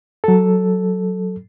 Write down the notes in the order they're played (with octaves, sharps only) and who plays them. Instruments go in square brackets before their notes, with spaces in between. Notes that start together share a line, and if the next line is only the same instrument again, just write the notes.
[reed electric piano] F#3 A4